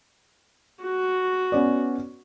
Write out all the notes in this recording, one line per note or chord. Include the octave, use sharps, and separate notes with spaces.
F#4
B3 C#4 D5